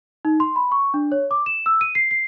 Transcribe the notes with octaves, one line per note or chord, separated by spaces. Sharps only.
D#4
C6
B5
C#6
D4
C#5
D6
E7
E6
D#7
C7
C7